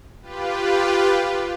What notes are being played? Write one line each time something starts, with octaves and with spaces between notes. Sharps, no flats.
F4 G4 B4